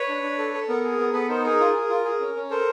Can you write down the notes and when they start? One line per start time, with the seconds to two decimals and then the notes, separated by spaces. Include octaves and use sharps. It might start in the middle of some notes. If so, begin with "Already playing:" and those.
Already playing: B4 C#5
0.08 D4
0.22 D4
0.38 A4
0.53 A4
0.68 B3 A#4
0.84 G#4
0.99 B3
1.13 B3 A4 B4
1.28 D#4 A#4 C5
1.44 G#4 A#4
1.60 F4
1.75 G#4
1.89 F4
2.04 G#4
2.20 C#4
2.36 C#4
2.50 A4 A#4 C5